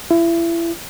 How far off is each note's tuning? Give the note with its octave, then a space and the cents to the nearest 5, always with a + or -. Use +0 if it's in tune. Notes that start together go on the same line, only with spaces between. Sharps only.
E4 +30